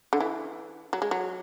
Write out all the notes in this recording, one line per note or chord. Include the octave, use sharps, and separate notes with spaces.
D3
E3
F#3
G#3
F#3